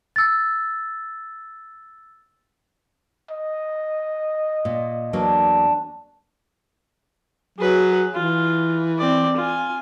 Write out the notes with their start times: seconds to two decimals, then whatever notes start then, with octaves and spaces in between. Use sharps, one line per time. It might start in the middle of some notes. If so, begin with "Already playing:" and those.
0.16 E6 A6
3.30 D#5
4.65 A#2
5.13 E2 F#3 A#3 D4
7.58 F#3 G#4 B4
8.14 E3 F4
8.98 C4 D5
9.37 F4 G#5